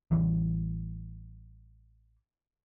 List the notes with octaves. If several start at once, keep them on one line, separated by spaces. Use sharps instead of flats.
A1 E3 G3